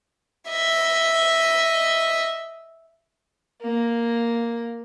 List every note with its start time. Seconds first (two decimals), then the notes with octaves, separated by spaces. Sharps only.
0.49 D#5 E5
3.62 A#3